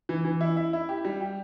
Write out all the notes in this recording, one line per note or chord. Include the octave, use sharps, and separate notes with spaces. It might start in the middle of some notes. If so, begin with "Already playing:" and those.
E3
E3
E4
E4
E4
G4
G3
G4